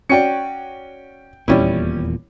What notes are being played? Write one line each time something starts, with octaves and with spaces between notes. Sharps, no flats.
C#4 F#4 D5 G5 C#7
D#1 E2 A#2 G3 C#4 E4